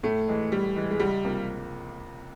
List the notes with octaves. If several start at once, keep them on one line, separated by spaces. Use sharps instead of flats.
A2 A3
E3 G#3
A2 G3
E3 G#3
G#3
C#2 G3
C3 F3 A#3